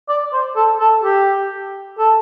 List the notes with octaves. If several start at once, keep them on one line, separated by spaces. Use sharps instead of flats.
D5
C5
A4
A4
G4
A4